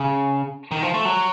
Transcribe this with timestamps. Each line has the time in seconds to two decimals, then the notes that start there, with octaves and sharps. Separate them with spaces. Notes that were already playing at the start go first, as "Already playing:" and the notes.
Already playing: C#3
0.71 D#3
0.82 F3
0.94 A3
1.05 F#3